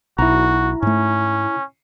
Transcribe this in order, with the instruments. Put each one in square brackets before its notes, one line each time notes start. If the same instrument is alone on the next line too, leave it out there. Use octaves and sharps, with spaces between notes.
[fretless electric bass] B1 [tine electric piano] E4 A#5 [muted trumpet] F#4
[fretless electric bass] G#2 A3 [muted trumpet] C#4